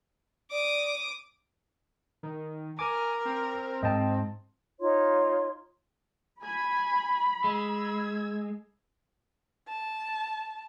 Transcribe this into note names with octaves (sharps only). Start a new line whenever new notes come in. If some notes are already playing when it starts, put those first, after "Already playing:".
D5 D6 D#6
D#3
A#4 G#5 D6
C4
G#2 D#5 G5 A5
D#4 F4 C#5 C6
G#5 B5 G#6
G#3 E6 G#6
A5